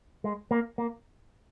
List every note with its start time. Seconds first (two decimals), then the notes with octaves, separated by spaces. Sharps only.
0.24 G#3
0.51 A#3
0.78 A#3